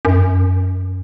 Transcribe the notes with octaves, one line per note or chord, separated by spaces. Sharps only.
F#2